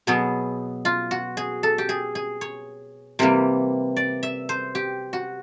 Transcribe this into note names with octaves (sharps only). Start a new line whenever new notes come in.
B2 F#3 B3 G#4
F4
F#4
G#4
A4
G4
G#4
G#4
C#5
C3 E3 G3 A#3
D5
E5
C5
G4
F#4